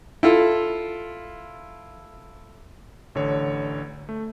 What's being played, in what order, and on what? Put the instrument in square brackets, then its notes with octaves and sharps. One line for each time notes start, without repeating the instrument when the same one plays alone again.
[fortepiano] E4 F4 A4
[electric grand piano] A1 D3 C#5
A3